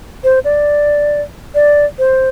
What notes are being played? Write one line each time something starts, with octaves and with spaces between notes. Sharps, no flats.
C5
D5
D5
C5